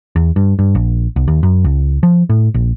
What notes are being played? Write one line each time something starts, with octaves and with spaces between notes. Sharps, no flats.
E2
G2
G2
A#1
C2
D#2
F#2
C#2
F3
A2
A#1